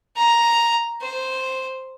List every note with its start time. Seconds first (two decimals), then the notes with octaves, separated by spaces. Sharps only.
0.17 A#5
1.02 C5